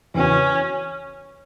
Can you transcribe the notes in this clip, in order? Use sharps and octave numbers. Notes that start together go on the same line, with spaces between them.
E2 C#3 E3 B3 C#4 F#4